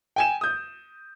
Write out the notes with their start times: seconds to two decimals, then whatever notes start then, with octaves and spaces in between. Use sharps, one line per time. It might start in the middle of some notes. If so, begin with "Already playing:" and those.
0.16 G5 G#5 E7
0.41 D#6 G6